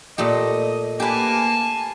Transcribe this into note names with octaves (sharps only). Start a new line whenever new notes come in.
A#2 A3 G4 D#5
A#3 G4 B4 G#5 A5